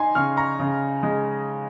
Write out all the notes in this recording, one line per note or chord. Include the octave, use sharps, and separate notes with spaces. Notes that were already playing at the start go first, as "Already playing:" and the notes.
Already playing: D#4 G#5 C6
C#3 C#6 F6
A#5 C#6
C#3
G#3